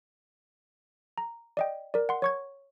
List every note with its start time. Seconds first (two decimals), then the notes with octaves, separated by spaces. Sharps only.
1.18 A#5
1.57 D5 D#5 G5
1.94 A#4 D5
2.09 F#5 C6
2.22 C#5 C#6 G#6